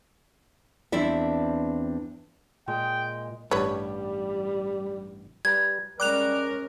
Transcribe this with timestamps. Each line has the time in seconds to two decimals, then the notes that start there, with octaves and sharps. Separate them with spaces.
0.92 E2 C4 D4 E4 D5 E5
2.68 A#2 G#3 G5
3.51 A1 G2 G3 B4 C#5 A5
5.45 G3 B4 A#5 G#6
6.00 G3 G#3 C#4 A#4 D6 F#6 F7